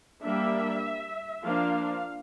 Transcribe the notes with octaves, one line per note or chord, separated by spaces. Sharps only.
G3 A#3 D4 E5
F3 A#3 D4 F5